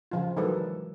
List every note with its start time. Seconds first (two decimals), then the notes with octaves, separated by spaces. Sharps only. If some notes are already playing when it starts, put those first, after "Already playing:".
0.11 C#3 F3 F4
0.37 D#3 E3 F#3 G#3 A4 B4